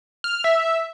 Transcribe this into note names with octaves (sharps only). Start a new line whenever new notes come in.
F6
E5